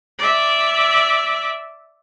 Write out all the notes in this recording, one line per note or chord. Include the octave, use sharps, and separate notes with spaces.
D5 E5